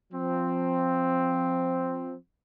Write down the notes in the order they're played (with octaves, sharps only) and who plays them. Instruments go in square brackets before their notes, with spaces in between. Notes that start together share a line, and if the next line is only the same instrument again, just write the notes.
[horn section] F3 C4